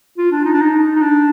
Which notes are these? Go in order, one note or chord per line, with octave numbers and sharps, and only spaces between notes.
F4
D4
D#4
D4
D#4
D#4
D4